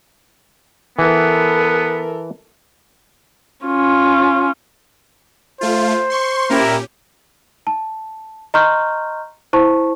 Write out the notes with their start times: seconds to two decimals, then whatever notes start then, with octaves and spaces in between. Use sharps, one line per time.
0.99 E3 B3 A4 A#4
3.65 C#4 F4
5.61 A3 F4 C5
6.10 C6 C#6
6.50 A#2 C#4 E4 G4 A#4
7.67 A5
8.54 D#5 A#5 C6 C#6 F6 G6
9.53 E4 C5 A5 C#6